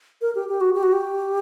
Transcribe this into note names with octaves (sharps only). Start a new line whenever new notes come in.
A#4
G4
G4
F#4
G4
F#4
G4